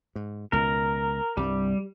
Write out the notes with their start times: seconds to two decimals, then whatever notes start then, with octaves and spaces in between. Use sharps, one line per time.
0.15 G#2
0.52 C#2 B2 A#4
1.37 C2 G2 G3